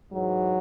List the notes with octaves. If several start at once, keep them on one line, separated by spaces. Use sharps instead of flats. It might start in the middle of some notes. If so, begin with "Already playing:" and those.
G#2 E3 F#3